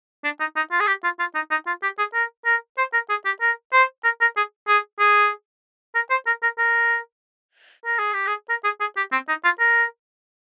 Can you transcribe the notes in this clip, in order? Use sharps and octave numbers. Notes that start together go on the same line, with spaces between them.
D4
D#4
D#4
F4
G#4
G4
F4
F4
D#4
D#4
F4
G4
G#4
A#4
A#4
C5
A#4
G#4
G4
A#4
C5
A#4
A#4
G#4
G#4
G#4
A#4
C5
A#4
A#4
A#4
A#4
G#4
G4
G#4
A#4
G#4
G#4
G4
C4
D#4
F4
A#4